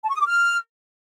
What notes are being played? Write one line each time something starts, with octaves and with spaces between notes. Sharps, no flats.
A5
C#6
D#6
D6
F6